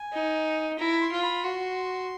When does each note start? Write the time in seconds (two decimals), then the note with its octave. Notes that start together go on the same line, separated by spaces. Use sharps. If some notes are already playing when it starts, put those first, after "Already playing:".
Already playing: G#5
0.13 D#4
0.79 E4 A#5
1.01 C6
1.12 F4
1.23 B5
1.44 F#4 C6